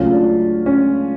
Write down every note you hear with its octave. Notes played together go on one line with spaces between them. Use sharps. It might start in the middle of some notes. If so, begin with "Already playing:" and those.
Already playing: C#2 C#3 F#3 A3 C#4 F4
D4
C#4